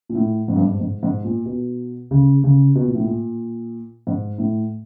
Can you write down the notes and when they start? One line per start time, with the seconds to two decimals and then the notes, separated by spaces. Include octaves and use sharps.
0.09 A#2
0.15 A2
0.48 G#2
0.56 G2
0.64 G#2
0.80 G#2
1.03 G#2
1.25 A#2
1.45 B2
2.11 C#3
2.44 C#3
2.75 B2
2.85 A#2
2.95 A2
3.04 A#2
4.07 G#2
4.38 A2